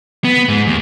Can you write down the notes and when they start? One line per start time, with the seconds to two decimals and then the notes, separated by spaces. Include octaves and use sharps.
0.24 B3
0.49 G#2
0.67 D#2